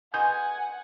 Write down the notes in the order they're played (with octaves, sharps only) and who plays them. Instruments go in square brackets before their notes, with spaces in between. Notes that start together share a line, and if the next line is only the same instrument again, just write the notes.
[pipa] B2 G#4 C6 [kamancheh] F#5 [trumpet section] G#5 [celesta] G6